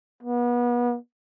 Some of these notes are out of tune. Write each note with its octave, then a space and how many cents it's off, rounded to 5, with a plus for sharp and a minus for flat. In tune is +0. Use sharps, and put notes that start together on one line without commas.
B3 -35